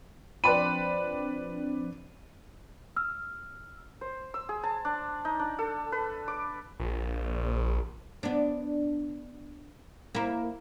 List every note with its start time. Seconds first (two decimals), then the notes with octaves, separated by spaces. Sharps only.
0.44 F3 C4 D4 B4 D5 B5 D#7
2.96 E6 F6
4.01 C5
4.34 E6
4.49 G#4
4.63 A5
4.85 D4
5.25 D#4
5.39 D4
5.59 A4
5.92 B4
6.28 D6
6.80 A#1
8.23 B3 D4
10.15 A#3 E4